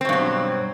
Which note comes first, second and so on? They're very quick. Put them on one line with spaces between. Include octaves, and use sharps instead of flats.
C4 B2 G2 F#3